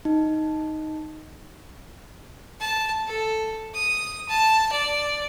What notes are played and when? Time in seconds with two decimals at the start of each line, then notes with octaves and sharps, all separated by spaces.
0.05 D#4
2.60 A5
3.07 A4
3.74 D#6
4.29 A5
4.72 D5